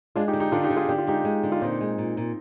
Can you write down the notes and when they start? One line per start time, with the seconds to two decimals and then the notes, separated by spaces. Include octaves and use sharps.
0.16 G#3 D4 F4
0.28 D#4 G4
0.33 D3
0.40 D#4 G4
0.52 D3 D4 F4
0.64 D#4 G4
0.70 D3
0.76 F4 G#4
0.89 D3 G4
0.98 F4
1.07 G#3 D#4 G4
1.25 G#3
1.43 D3
1.52 F4
1.62 A#2 C4 D#4
1.81 G#3
1.98 A#2
2.17 A#2